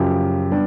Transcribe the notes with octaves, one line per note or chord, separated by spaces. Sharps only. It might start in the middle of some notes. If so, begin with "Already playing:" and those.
Already playing: F#2 C#3 F3 G4
G3 B3 D4